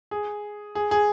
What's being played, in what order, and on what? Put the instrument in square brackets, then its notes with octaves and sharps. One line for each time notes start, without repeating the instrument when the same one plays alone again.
[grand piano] G#4
G#4
G#4